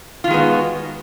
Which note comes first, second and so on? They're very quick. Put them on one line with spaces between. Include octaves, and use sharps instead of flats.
F4 D#3 G#3 B3 F#4